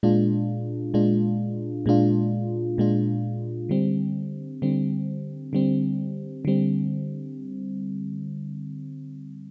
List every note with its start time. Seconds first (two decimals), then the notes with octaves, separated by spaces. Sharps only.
0.03 A#2 G#3 D4 F4
0.94 A#2 G#3 D4 F4
1.86 A#2 G#3 D4 F4
2.78 A#2 G#3 D4 F4
3.69 D3 G3 C4
4.62 D3 G3 C4
5.53 D3 G3 C4
6.45 D3 G3 C4